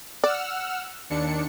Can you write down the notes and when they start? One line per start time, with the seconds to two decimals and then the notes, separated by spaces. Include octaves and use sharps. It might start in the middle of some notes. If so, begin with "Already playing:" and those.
0.24 D5 F#5 E6 F6
1.10 D#2 D4 C#7